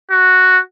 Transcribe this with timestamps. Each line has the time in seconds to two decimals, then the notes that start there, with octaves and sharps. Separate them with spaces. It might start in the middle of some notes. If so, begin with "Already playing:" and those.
0.11 F#4